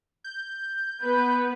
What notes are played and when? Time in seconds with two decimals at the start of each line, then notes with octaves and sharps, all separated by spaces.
0.24 G6
1.02 B3 B4